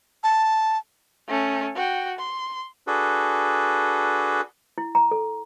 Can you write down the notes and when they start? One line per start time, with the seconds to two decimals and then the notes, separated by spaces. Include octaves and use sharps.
0.24 A5
1.28 A3 C#4
1.75 F#4 G5
2.18 C6
2.87 D4 F#4 G#4 A4 B4
4.78 E4
4.95 A#5
5.11 A4